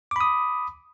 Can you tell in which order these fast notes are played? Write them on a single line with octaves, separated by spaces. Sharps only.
D6 B5 D#6